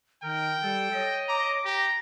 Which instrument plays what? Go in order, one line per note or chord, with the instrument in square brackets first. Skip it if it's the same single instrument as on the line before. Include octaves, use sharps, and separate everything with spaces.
[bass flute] D#3 [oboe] A#4 [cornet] G5
[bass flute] G3 [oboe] A4
[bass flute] C#5 [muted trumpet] D#5
[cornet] A#5 [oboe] D6
[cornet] G4 [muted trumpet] A#5